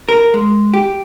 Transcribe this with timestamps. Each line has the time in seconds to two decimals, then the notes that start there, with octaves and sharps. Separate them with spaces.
0.09 A#4
0.34 G#3
0.74 G4